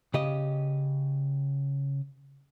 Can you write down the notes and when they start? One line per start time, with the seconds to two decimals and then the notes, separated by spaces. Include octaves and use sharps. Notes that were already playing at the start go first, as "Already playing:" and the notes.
0.14 C#3 G4 D#5